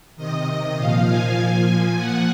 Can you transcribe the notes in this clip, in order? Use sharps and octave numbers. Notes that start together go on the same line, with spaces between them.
C3 D#3 D#5
A#2 F3 F5
G#5
A#2 F3
G#5
A#2 F3 F#5